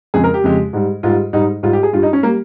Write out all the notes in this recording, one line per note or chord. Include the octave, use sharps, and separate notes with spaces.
F2 C#3 G#3 G#4
A#4
G4
F2 C#3 G#3
G#2 G3
G#2 G3 F4
G#2 G3 D#4
G#2 G3 F4
G4
G#4
G2 G3 F4
D#4
C#4
G3 A#3